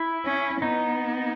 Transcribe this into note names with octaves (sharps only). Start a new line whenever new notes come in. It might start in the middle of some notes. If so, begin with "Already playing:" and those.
Already playing: E4
C#4
B3 D#4